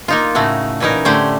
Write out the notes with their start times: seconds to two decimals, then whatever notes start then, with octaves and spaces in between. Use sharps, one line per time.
0.08 A#3 D#4 F4
0.35 A2 C#3 A3 F#4
0.80 A#2 E3 C#4 D#4 A#4
1.05 A2 D3 A3 C#4 G4 C5